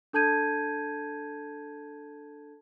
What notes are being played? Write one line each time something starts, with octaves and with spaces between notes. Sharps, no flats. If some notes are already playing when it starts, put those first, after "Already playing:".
D4 A4 A5 G6 G#6 D#7